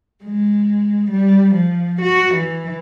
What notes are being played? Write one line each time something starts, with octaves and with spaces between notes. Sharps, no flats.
G#3
G3
F3
F#4
E3